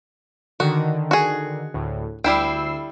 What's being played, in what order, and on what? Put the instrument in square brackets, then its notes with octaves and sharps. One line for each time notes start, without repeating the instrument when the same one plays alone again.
[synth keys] D3 D#3 [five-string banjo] F#4
[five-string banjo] F#4 G#4
[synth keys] D2 A2
[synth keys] D2 E6 C7 [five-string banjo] G3 E4 G5